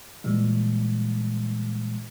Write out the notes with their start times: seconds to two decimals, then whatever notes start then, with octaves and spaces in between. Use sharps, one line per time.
0.24 A#2 E3 G3 G#3